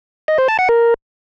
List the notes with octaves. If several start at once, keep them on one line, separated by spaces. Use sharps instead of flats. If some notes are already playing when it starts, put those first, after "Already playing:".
D#5
C5
A5
F#5
A#4